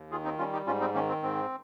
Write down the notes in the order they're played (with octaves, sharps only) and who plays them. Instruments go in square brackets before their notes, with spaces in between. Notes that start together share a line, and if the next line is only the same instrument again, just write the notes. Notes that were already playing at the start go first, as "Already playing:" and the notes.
Already playing: [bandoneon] D#2
D#3 F4 G#4
C4 D#4
G3 C#4 F4
D#4 G4
G#2 C#4 F4
C4 D#4
D#3 A#3 C#4
C4
G#2 C4